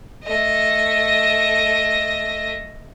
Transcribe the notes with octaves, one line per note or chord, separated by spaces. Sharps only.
A3 D#5